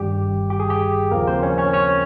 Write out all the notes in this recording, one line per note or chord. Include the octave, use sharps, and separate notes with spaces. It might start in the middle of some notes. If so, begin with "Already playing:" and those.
Already playing: G1 G2 D#3 G3 G4
G4
G#4
G4
D#2 C#3 F3 A#3 A#4
C4 C5
C#4 C#5
C#4 C#5
C#4 C#5